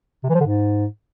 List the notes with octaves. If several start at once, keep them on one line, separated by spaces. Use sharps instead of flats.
C3
E3
F3
D3
G#2